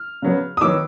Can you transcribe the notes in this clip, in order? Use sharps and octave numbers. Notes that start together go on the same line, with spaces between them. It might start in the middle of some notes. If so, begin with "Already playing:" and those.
Already playing: F6
C#3 F#3 B3
D#6
D#3 F#3 B3 D6 E6